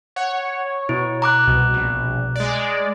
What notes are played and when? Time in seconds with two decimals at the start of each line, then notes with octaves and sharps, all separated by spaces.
0.16 C#5 F#5
0.89 B2 E4
1.22 A#5 D6 F#6
1.47 C2 B2
1.73 A#1
2.36 G#3 D5